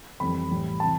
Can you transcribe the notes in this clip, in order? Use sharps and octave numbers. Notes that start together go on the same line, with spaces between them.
F2 E3 G3 B5
A2 E3 G3
C3 E3 A5